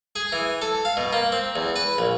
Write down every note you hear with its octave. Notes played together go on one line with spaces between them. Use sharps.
G#4
E3
A4
F5
B2
A#3
C4
E2
B4
A#1